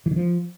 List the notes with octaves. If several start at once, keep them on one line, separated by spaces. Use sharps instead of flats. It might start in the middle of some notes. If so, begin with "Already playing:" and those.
E3
D#3
F3